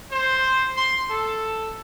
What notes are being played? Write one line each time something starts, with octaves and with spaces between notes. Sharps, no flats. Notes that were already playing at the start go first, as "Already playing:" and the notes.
C5
C6
A4